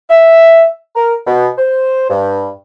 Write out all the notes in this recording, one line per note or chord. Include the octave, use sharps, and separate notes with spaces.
E5
A#4
B2
C5
G2